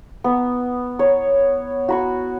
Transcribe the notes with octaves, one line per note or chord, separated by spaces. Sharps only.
B3
C#5
F#4 B5 C#6